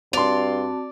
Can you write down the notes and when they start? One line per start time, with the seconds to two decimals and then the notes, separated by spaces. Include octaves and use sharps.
0.13 G2 C4 F#4 D5 A5 C6 F7